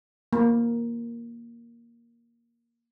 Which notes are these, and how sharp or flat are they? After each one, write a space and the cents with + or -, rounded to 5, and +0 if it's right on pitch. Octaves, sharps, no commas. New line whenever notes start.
A#3 +10